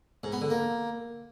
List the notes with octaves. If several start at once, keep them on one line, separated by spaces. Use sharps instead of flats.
G#2
B3
D3
A#3